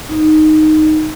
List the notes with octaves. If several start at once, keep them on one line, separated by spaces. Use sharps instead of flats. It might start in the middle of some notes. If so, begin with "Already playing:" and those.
D#4